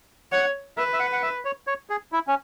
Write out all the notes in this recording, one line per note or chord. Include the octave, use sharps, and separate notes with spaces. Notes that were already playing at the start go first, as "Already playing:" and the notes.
C#5 F#5
B4 E5
E5
F#5
F#5
E5
C#5
C#5
G#4
E4
C#4